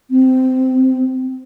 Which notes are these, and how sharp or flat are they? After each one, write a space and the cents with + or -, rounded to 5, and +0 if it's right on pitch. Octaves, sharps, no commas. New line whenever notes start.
C4 -15